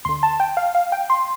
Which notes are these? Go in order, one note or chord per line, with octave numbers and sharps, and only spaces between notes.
D2 D3 C6
A5
G5
F5
F5
G5
C6